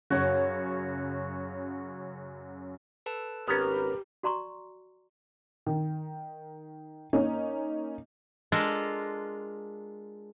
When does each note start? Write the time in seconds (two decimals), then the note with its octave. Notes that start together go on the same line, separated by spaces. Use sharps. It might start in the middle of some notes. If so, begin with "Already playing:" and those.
0.10 F#2 C#3 F#4 C#5
3.06 A4 B4 A5
3.48 G#1 B3 C#4 G4 A#4 B4 A#5 F6
4.23 F#4 D5 A#5 C6 C#6
5.67 D#3
7.13 A#3 C#4 D#4
8.52 G#3 D4 F4 A4 A#4